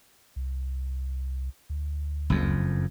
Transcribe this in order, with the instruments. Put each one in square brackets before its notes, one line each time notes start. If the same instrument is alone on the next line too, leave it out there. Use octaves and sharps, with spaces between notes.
[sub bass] C2
D2
[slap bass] F#1 F2